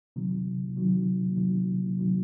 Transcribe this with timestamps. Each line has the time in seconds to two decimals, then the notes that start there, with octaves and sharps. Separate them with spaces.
0.16 C3 D#3 F#3
0.76 C3 D#3 F#3
1.36 C3 D#3 F#3
1.98 C3 D#3 F#3